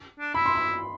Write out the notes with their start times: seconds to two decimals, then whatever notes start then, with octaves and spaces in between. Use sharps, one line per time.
0.19 D4
0.34 E4 B5
0.46 C6
0.55 B5